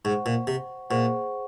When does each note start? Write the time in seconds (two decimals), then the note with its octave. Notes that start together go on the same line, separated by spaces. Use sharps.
0.05 G#2 C5 F#5 C#6
0.26 A#2
0.47 C3
0.90 A#2 G#4 C5 F#5 C#6